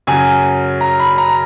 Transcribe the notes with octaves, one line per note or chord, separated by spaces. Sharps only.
F#2 C#3 F#3 G#5
A#5
B5
A#5